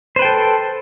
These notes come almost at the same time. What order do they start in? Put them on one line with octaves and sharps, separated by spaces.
C5 B4 G5 A4